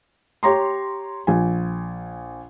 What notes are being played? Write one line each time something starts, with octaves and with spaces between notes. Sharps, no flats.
G4 C#5 A#5 C6
A#1 G#5